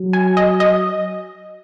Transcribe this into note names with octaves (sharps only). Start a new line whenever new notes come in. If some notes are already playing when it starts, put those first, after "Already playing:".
Already playing: F#3
G#5
D#5
D#5